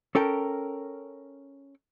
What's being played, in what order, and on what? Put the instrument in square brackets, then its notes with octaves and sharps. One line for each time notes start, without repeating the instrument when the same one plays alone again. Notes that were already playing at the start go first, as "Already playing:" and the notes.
[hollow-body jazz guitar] C#4 A4 A#4 G5